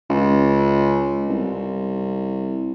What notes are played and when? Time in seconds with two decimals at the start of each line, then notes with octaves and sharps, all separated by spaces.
0.10 C#2
1.29 C2